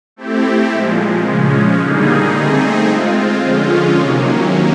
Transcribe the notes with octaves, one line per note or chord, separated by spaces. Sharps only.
A3 C4 E4 G4
A#2 F3 G#3
C#3 F3 G#3 C#4
D3 G3 A#3 D#4 G#4
A3 C4 D#4 G#4
G#3 C4 F4
D3 F3 G#3 C#4 F4
C3 D#3 F#3 A#3 C#4